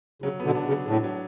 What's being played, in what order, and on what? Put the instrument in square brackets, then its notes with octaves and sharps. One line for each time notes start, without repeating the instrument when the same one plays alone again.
[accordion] C#3 [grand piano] F#3
[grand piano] B3
[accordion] B2 D3
[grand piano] D4
[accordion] C#3
[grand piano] F#3
[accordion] A2 [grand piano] D4
[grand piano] F#3